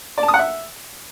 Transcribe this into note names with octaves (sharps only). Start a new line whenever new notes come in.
D5
A5
D#6
F#5
E5